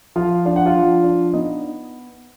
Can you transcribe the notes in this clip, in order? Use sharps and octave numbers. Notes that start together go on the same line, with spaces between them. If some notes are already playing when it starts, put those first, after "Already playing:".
F3 F4 F5
D4 F5
F#5
F4 F5
F3
D4
B3 D#4 D#5